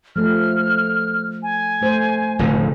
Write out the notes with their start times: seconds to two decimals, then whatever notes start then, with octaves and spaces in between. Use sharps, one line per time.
0.16 F3 A3 A4 F6
1.43 G#5
1.82 A3 C5
2.39 F1 A2 D3